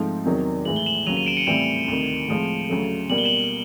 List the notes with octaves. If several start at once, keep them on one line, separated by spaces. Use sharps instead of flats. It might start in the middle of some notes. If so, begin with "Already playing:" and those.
Already playing: G#2 F3 A3 C4 D#4
E2 C3 D#3 F#3
A2 E3 G#3 F#7
G7
E7 F#7
D#2 C#3 F#3 D#7 F7
D#7 F7
D7 E7
C#7 D#7
A2 E3 G3 C4 D7 E7
D2 C3 D#3
A2 F3 G#3 C4
D2 C#3 F#3 A3
B2 G3 A#3 F#7
G7
E7 F#7